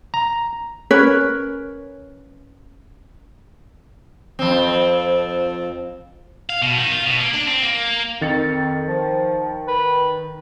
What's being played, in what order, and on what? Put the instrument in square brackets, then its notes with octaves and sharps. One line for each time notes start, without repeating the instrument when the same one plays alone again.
[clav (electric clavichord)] A#5
[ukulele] C#4 A#4 B4 C#5
[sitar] F2 C4
[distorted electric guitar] F5
B2
D#3
F4
B2
A#3
D4
C4
A#3
[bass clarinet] F2 [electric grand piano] D#3 A6 C#7
[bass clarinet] F3
B4